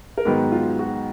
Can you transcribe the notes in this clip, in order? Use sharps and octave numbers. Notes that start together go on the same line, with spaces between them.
A#4
G#2 D#3 F#3 B3 B4
F4
F#4